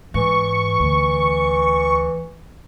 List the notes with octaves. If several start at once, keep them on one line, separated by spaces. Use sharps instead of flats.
G#2 E3 C#6
D2